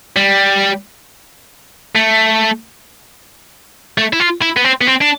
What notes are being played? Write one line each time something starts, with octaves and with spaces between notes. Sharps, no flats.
G3
A3
A3
E4
F4
E4
B3
C4
B3
C4
D4